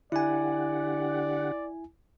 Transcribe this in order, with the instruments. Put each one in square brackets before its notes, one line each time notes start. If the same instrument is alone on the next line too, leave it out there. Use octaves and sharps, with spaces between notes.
[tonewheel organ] D3 G4 F#5 [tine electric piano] E4 G#5 [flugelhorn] D5